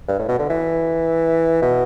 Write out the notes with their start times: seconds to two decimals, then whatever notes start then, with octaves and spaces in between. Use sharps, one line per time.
0.08 G2
0.19 A2
0.29 B2
0.39 D3
0.50 E3
1.62 B2